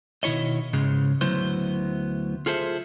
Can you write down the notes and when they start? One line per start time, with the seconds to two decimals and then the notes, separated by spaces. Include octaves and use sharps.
0.23 B2 D#3 E4 C#5 D#5
0.73 G#2 C#3 G#3
1.21 D2 F#3 B3 E4 C5
2.46 F4 G#4 A4 C5 E5